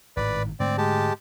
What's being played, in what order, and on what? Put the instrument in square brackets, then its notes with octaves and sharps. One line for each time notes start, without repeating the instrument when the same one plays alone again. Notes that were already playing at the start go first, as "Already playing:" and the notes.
[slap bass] G#1 A2 D#3 [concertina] B4 D5
[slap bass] G#2 D3 A3 [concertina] C4 D5
[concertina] G#3 G4 A5